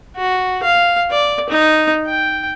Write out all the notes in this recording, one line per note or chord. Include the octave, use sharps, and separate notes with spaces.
F#4
F5
D5
D#4
G5